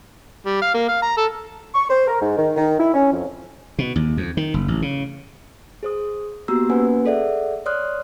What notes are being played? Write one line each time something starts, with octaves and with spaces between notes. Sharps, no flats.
G3
F5
A#3
F5
A#5
A4
C#6
C5
A#4
G#2
D#3
D#3
E4
C#4
F2
B2
D#2
F2
D#3
F#1
A1
C#3
G#4 C5 D#6
A#3 B3 F#4 G4 A#5 E6
A#3 C#4 B4 C5 F#5 G#5
G#4 A4 D5 E5 F#5
C#5 D5 C6 D#6 F6 F#6